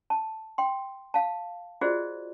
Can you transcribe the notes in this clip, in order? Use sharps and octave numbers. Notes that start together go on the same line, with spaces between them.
A5
G5 C6
F5 A5
F4 F#4 G#4 C5 D5 D#5